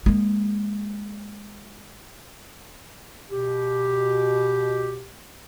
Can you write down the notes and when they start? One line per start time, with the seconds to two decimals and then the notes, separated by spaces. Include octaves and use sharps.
0.06 G#3 A#3
3.29 B2 G4